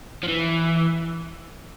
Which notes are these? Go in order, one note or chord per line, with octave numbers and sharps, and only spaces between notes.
F3
E3